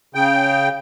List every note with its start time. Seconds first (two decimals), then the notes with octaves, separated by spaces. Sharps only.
0.15 C#3 G5